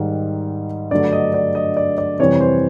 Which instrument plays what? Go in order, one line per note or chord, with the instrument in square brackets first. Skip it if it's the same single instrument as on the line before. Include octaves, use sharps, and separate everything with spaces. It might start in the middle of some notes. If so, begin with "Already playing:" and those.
Already playing: [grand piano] G#2 D#3 G3
G2 D3 F#3 A3 D5
D#5
D5
D#5
D5
D5
F2 C3 E3 G3 C#5
C5